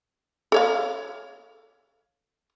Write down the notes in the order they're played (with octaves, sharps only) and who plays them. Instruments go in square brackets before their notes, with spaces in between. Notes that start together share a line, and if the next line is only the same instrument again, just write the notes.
[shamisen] A4 C#5 F5